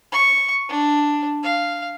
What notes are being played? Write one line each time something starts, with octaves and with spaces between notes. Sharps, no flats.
C#6
D4
F5